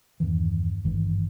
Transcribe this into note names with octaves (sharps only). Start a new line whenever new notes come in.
E2 G2 D#3 E3
G#1 G2 D#3 E3